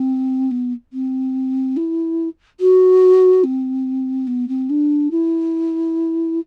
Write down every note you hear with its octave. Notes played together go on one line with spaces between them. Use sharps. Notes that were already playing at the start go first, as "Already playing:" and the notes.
Already playing: C4
B3
C4
E4
F#4
C4
B3
C4
D4
E4